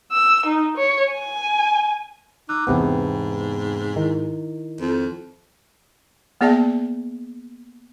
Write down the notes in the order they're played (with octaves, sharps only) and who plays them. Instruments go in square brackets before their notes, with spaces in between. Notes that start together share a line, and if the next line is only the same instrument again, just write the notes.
[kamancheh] E6
D#4
C#5
G#5
[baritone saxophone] D#4 [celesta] D6 E6 F#6
[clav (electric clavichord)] E2 C3 B3 [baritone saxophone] G#2 [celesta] G5 A5 B5
[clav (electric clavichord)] D#3 [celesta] E4
[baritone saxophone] F2
[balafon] A#3 B3 G#4 D5 E5 A5